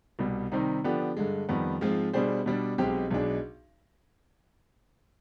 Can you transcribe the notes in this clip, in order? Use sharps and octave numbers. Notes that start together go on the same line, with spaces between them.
C2 B2 G3
C3 D#3 G3 C4 D#4
D3 F3 B3 D4 G4
G2 D3 G#3
F2 D#3 G3 B3
G#2 F3 G#3 C4 F4
B2 G3 D4 G#4 C5
B2 G3 D4
B1 B2 G#3 C4 G4
B1 B2 G#3 D4 G#4